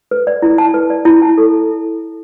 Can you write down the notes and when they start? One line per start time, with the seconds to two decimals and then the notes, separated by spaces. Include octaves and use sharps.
0.11 B4
0.27 D5
0.42 E4
0.58 A5
0.74 B4
0.90 D5
1.05 E4
1.22 A5
1.38 A4